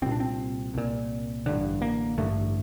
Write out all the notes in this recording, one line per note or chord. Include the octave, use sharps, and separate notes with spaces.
C2 A#2 C4
D4
C4
C2 A#2
A1 G2 D3
A#3
A1 G2 D3 A3